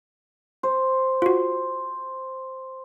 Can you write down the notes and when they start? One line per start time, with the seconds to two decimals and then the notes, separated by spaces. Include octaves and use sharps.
0.63 C5
1.22 F4 F#4